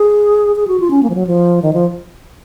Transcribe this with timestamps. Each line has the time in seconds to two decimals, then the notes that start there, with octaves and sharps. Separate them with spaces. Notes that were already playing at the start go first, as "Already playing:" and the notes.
Already playing: G#4
0.56 G#4
0.68 F#4
0.80 F4
0.91 C#4
1.03 A#3
1.10 F3
1.15 F#3
1.27 F3
1.62 D#3
1.73 F3